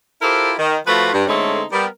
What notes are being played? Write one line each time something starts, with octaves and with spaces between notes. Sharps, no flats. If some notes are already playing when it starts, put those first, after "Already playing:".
E4 F4 G4 A4 A#4 C5
D#3
F3 A3 F4 F#4 B4
G2
D3 G#3 A3 C4 C#4 D#4
G3 B3 A#4